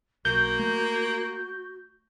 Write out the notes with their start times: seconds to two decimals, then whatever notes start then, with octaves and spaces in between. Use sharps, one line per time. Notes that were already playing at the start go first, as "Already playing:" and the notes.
0.25 B1 A#3 F#4 G6
0.59 A3